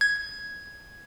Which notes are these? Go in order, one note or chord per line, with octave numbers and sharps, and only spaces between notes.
G#6